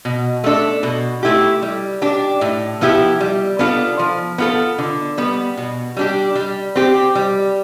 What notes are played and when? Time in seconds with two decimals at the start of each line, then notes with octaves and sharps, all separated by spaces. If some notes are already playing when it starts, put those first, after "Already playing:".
0.05 B2
0.44 A3 D4 A4
0.83 B2
1.23 A3 E4 G4
1.62 G3
2.02 D4 G4
2.41 A2
2.81 F3 B3 E4 G4
3.20 G3
3.59 B3 D4 F4 A4
3.99 F3
4.38 B3 F4 A4
4.78 D3
5.18 G3 B3
5.57 B2
5.97 G3 D4 G4
6.35 G3
6.76 C4 G4
7.15 G3